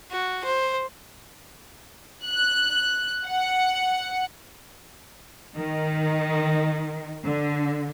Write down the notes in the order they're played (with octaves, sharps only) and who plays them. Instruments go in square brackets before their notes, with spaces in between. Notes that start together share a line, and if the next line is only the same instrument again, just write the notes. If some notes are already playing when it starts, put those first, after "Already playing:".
[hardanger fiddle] F#4
C5
[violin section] F#6
F#5
[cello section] D#3
D3